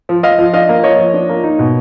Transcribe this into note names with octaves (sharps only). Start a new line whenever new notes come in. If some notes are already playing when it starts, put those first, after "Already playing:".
F3
F3 D#5 F5
F3
D4 D#5 F5
A#3
F3 C#5 D#5
F3
D4
A#3
D#4
B2